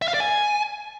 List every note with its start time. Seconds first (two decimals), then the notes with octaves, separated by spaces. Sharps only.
0.02 E5
0.08 F5
0.14 D5
0.20 G#5